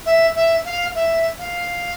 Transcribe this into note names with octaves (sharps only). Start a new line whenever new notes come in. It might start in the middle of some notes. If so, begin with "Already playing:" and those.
E5
E5
F5
E5
F5